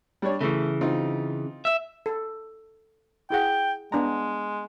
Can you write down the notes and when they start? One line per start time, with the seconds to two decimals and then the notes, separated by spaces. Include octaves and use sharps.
0.22 G3 D4 C#5
0.41 C#3 E3 A3
0.81 C4 D#4 F4
1.65 E5
2.06 A4
3.30 E4 G#4 F#5 G5
3.92 G#3 B3 D4 A#5